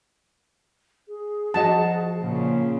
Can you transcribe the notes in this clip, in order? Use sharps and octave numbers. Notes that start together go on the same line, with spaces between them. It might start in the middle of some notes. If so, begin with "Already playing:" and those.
G#4
F3 F#4 D#5 A5
A#2 C#3